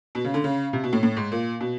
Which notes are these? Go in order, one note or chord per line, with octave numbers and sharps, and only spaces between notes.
B2
C#3
D3
C#3
C3
B2
A2
A2
G#2
A#2
B2